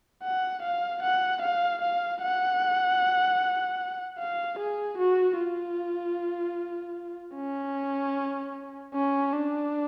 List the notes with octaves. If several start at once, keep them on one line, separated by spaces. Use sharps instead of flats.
F#5
F5
F#5
F5
F5
F#5
F5
G#4
F#4
F4
C#4
C#4
D4